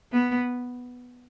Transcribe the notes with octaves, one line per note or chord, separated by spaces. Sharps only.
B3